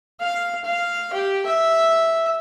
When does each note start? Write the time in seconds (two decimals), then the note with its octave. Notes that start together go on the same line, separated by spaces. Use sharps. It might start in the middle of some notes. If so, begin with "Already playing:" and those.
0.20 F5
0.64 F5
1.13 G4
1.46 E5